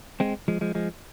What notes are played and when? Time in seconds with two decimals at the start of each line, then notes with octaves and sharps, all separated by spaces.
0.20 G#3 C4
0.48 F3 G#3
0.61 F3 G#3
0.75 F3 G#3